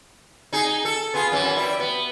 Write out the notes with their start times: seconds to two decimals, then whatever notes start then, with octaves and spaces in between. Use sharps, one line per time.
0.53 D#4 G#4
0.85 A4
1.14 B3 F4 G#4
1.32 F#2 E3
1.56 G3 E4
1.80 B3